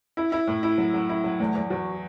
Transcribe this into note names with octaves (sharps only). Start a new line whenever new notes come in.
E4
E4
A2
E4
F#3
F#3
E4
F#3
E2 A3
E2
E2 F#4